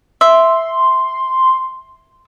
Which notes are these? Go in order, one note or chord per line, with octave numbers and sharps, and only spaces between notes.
E5 C6